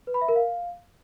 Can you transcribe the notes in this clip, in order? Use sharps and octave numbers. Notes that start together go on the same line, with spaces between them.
B4
B5
E5
A#4
F5